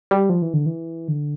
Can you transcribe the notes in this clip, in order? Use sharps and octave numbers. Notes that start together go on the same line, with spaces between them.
G3
F3
E3
D3
E3
D3